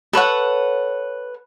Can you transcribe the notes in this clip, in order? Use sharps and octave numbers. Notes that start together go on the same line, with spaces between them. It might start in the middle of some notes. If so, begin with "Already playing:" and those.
A4 B4 C#5 F#5